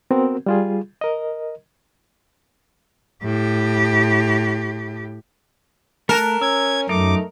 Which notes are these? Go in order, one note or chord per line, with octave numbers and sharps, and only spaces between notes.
B3 C4 F#4 A#4
G3 F4 G#4
A#4 D#5
A2 G4
A3 A#4 A5 F#6
C#4 E6 G#6
F#2 A3 D#4 D6